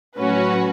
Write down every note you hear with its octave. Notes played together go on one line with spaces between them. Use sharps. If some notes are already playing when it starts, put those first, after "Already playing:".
A2 F#3 C#4 F#4 B4